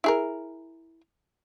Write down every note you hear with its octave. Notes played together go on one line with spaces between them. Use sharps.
E4 G#4 A#4